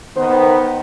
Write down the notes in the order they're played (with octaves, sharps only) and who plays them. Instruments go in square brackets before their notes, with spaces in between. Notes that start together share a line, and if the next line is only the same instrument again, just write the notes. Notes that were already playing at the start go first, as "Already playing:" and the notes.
[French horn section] D#3 B3 [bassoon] C5